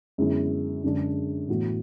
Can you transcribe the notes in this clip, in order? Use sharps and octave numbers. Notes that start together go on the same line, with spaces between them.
F#2 D3 G#3 B3 E4
F#2 D3 G#3 D4 G#4
A2 E3 B3 F#4